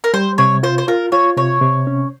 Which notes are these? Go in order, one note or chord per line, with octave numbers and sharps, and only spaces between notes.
A#4
G3 C5
C3 C#5
F4 C5
C5
F4 A#4
F4 C#5
C3 C#5
C3
C#4